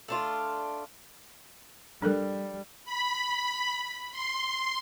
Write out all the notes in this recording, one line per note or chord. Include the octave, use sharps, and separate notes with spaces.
A3 D4 F4
G3 D4 A4 A#4
B5
C6